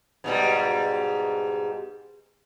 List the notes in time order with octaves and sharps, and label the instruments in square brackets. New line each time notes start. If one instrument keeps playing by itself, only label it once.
[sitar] G#2 B2 G3